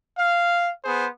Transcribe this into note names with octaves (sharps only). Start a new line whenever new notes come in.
F5
B3 G#4 C5